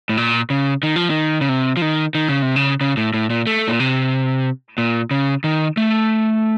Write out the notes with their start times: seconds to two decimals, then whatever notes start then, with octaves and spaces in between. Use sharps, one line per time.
0.09 A2
0.17 A#2
0.50 C#3
0.83 D#3
0.96 F3
1.10 D#3
1.41 C#3
1.49 C3
1.77 F3
1.82 D#3
2.15 D#3
2.29 C#3
2.42 C3
2.56 C#3
2.81 C#3
2.97 A2
3.14 A2
3.30 A#2
3.47 A3
3.68 A#2
3.80 C3
4.78 A#2
5.11 C#3
5.44 D#3
5.77 A3